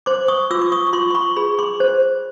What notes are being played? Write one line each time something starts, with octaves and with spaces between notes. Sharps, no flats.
C5 C6 D6
C#6 D#6
F4 D6 E6
D6
C#6 D#6
C#6
F4 C6 D6
C6
B5 C#6
G#4 B5 C#6
C6 D6
C5